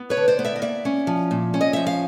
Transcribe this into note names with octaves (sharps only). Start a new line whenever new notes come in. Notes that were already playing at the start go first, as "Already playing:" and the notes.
Already playing: B3
B4 C#5
D3
C5 D5
B3
D5 E5
D#5
A#3 D5 E5
C#4
F3
A#2
C#4
D#5
F3 E5
F5